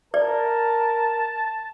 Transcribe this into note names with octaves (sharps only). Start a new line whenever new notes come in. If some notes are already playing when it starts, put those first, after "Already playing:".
A#4 D5 A5